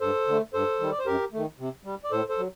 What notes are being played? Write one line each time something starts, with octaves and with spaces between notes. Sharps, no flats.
G2 A4 C5
D3 A3
G2 A4 C5
D#3 G3
D5
C5
F#2 G4 A#4
D#3 A3
C3
G3
D5
A2 A4 C5
A4 C5
F#3